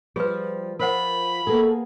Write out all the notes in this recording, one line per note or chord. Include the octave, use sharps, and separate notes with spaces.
F3 G3 G#4 B4 C5
F3 A#4 C5 F#5 B5
A#3 B3 G#4 A4